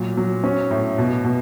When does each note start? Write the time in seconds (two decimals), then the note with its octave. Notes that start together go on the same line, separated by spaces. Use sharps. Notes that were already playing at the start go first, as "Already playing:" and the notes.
Already playing: A#2 F#3
0.17 F#3
0.44 C#4
0.71 A2
0.98 B2
1.24 B2